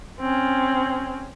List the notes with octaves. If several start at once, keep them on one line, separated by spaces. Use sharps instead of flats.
C4 C#4